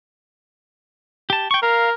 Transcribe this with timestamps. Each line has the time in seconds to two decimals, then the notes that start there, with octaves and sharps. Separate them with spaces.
1.30 G4 A5
1.51 G5 C#6
1.63 A#4 F5